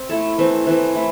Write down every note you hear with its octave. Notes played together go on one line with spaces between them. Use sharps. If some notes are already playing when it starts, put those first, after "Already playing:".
Already playing: C4
A3 E4 A4
E3 A3 C4
E3 A3 C4
A3 E4